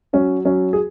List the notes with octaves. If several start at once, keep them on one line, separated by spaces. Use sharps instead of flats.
F#3 C#4
F#3 C#4
G#4